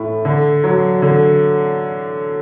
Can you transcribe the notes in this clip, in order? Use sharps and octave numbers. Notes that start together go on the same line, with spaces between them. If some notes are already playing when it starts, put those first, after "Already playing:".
Already playing: A2 A3
D3
F#3
D3